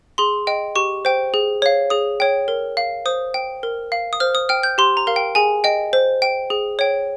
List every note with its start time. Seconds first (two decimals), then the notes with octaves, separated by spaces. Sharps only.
0.18 G#4 C6
0.47 D#5 G5
0.76 G4 C#6
1.05 C5 G5
1.34 G#4
1.62 C#5 F5
1.90 G#4 D#6
2.20 C#5 G5
2.48 A#4
2.77 F5
3.06 C5 D#6
3.34 G5
3.63 A#4
3.92 F5
4.13 D#6
4.20 C5 F6
4.35 D#6
4.49 G5 F6
4.63 G6
4.78 G4 C6
4.97 A#5
5.07 A#4 F5
5.16 G5
5.35 G#4 G#5
5.64 D#5 G5
5.93 C5
6.22 G5
6.50 G#4
6.79 C#5 G5